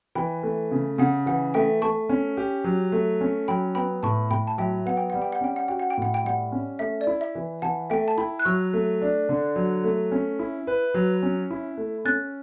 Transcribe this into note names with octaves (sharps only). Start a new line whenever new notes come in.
E3 G5 B5
A3
C#3
C#3 F#5
E3 F#5
A3 E5 G5
A3 A5 C#6
C#4
G4
F#3
A3
C#4
F#3 G5 B5
B3 G5 B5
A2 A5 C#6
A2 G5 B5
A5
F#3 E5 G5
B3 F#5
G5
G3 F#5
G5
F#5
C#4 G5
F#5
F#4 G5
F#5
G5
A2 F#5
G5
G3 F#5
C#4
A3 E5
D5
E4
E5
E3
E3 F#5 A5
A3 E5 G5
A5
E4 G5 B5
F#6
F#3 C#6 E6
A3
D4
D3
F#3
A3
C#4
E4
B4
F#3
C#4
E4
A3
C#4 F#6 A6